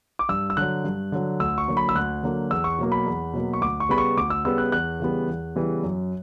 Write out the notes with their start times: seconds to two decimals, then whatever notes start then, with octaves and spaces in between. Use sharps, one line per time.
0.19 D6
0.29 G2 E6
0.50 E6
0.57 D3 F#3 F#6
0.84 G2
1.12 D3 F#3
1.40 D2 E6
1.58 C#6
1.68 D3 F#3 A#3
1.77 B5
1.89 E6
1.95 D2 F#6
2.23 D3 F#3 A#3
2.50 E2 E6
2.64 C#6
2.78 B2 F#3 A#3
2.92 B5
3.06 E2
3.33 B2 F#3 A#3
3.53 C#6
3.61 D2 D6
3.80 C#6
3.89 C#3 G3 B3 B5
3.98 C#6
4.17 D2 D6
4.30 E6
4.45 C#3 G3 B3 E6
4.58 F#6
4.72 E2 F#6
5.00 C#3 E3 G3 B3
5.28 E2
5.56 C#3 E3 G3 B3
5.83 F#2